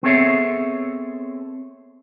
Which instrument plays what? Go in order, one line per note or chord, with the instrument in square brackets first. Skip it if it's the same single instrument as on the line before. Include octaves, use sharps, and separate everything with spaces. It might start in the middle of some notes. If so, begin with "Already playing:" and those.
[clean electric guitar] B3 C4 G#4 A4 C#5 E5